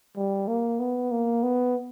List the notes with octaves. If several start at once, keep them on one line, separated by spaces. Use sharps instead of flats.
G3
A#3
B3
A#3
B3